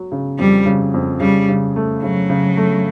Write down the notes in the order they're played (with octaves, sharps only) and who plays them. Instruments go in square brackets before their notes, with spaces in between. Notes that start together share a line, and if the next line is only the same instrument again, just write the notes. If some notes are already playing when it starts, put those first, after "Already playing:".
Already playing: [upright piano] F#3
C#3
[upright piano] F2 [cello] G3
[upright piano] C#3
F2
[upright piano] C#3 [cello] G3
[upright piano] C#3
A3
[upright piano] C#3 [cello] F#3
[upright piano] C#3
A3